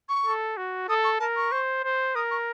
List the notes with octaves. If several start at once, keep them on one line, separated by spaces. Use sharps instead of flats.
C#6
A4
F#4
A4 D#6
C#6
A#4 A5
C#6
C5
C5
A#4 D#6
C#6